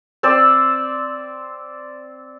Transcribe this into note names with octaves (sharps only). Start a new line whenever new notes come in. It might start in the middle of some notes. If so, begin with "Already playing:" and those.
C4 C5 D5 E6